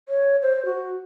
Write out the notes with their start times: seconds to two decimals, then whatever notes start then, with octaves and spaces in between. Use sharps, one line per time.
0.08 C#5
0.42 C5
0.65 F#4